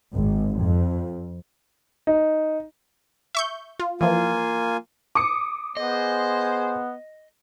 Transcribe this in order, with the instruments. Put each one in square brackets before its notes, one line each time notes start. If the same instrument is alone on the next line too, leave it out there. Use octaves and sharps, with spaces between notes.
[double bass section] G#1
F2
[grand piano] D#4
[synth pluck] E5 C#6 G6
F4
[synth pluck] E3 F3 [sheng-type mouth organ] A#3 F4 G#5
[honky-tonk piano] D6 D#6 C#7
[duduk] B3 [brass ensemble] G#4 C5 [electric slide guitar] D#5